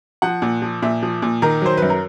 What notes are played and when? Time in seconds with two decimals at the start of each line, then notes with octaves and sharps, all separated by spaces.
0.22 F3 F#5
0.42 A#2
0.62 F3
0.82 A#2 E5
1.03 F3
1.22 A#2
1.42 D#3 A#4
1.62 F#3 C5
1.77 F#2 B4
1.90 A#4